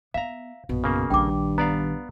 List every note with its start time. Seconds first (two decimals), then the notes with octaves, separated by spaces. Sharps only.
0.14 B3 E5 F5 A#5
0.69 A#1 F#2 B2
0.84 C#3 A#3
1.10 A#1 G2 D#3 G5 D6
1.58 B3 D5 F5 A#5